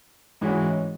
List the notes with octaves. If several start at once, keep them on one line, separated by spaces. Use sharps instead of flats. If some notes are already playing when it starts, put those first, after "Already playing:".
G#2 E3 G#3 C#4 F#4